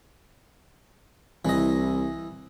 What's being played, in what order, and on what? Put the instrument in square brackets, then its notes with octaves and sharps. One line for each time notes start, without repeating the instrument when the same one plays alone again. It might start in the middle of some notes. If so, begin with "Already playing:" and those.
[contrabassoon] C2 [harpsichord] E3 D#5